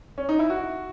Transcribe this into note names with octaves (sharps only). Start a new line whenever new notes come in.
C#4
D#4
E4
F#4